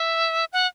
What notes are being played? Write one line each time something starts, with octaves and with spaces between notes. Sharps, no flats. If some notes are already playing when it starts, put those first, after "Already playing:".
Already playing: E5
F#5